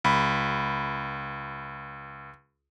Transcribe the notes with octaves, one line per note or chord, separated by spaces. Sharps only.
C#2 B5